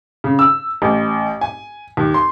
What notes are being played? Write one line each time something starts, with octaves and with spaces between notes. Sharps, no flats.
C#3
E6
A1
G#5
D#2
C6